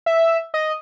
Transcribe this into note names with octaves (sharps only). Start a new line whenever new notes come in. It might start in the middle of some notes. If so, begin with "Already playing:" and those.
E5
D#5